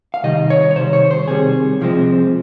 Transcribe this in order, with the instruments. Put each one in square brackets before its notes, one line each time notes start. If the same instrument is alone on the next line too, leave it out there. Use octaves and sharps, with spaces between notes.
[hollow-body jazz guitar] F5
C3 D#3 G3 D#5
C#5
C#5
C3 D#3 G3 C5
C#5
C5
C3 D#3 G3 G#4
C2 C3 F3 G#3 C4